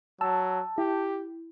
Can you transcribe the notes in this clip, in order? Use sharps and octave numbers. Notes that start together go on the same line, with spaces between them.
F#3 A5 E6
E4 G4